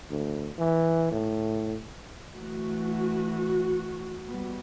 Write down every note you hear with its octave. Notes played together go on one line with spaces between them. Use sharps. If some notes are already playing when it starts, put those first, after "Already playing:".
D2
E3
A2
E3 A3 F#4
G3 B3